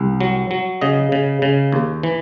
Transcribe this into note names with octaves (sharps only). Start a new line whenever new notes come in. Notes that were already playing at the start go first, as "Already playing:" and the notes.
Already playing: C2
F#3
F#3
C#3 D#5
C#3
C#3
D#2
E3